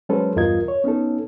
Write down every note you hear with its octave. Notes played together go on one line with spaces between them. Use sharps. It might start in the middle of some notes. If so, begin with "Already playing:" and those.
F#3 G#3 C#4 A4 B4 C5
E2 G2 F4 A#4 D#5 G#6
C#5
B3 C#4 D#4 A4